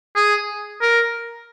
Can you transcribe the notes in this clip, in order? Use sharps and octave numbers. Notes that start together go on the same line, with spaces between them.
G#4
A#4